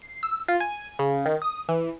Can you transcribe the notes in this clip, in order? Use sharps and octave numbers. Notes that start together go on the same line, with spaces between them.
C7
E6
F4
G#5
C#3
D#3
D#6
E3